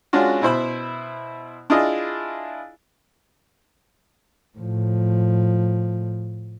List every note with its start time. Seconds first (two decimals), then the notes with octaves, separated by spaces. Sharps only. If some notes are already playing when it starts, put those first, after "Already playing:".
0.13 G#3 C#4 D4 F4 F#4
0.42 B2 E4 C5 B5
1.70 D4 E4 F4 G#4 D#5
4.58 A2 F3